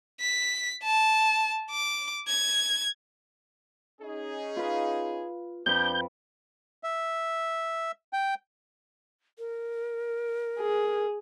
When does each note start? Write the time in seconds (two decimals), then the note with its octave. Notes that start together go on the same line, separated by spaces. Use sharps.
0.21 B6
0.84 A5
1.70 D6
2.28 G#6
4.02 C#4 D#4 G#4
4.56 F4 B4
5.66 F2 D4 B4 G6
6.83 E5
8.13 G5
9.38 A#4
10.59 G#4